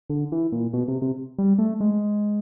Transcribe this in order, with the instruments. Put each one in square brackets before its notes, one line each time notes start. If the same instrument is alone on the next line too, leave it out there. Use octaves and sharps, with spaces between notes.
[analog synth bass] D3
E3
A#2
B2
C3
C3
G3
A3
G#3